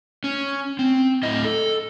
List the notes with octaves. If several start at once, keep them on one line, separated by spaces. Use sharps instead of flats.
C#4
C4
A2 E4 D#5
A4